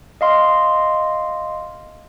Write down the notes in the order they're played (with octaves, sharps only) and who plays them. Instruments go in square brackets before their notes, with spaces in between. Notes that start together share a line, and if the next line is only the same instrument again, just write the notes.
[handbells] D#5 F5 C6